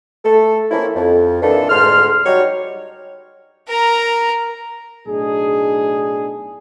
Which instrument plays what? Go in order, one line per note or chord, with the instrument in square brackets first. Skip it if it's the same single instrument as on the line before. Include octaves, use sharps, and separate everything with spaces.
[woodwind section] A3 A4
F3 A#3 C4 C#4 E4
F2
A#2 D#3 E3 D4 F4 A4
D2 G#2 D3 C6 F6
F#3 G3 D#4 F#4 C#5
[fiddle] A#4 A#5
[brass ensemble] B1 A2 D4 D#4 G#4